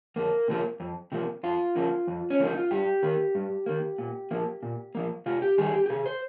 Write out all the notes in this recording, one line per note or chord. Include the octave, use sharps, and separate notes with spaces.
F2 A#3
C3 F3 A#3
F2
C3 F3 A#3
F2 F4
C#3 F3 A#3
F2
C#4
C#3 F3 A#3 D#4
F4
G2 G4
D#3 A#3
G2
D#3 A#3
A#2
F3 A#3
A#2
F3 A#3
C3 F4
G4
D#3 G3 G#4
G4
G4
C3 G#4
C5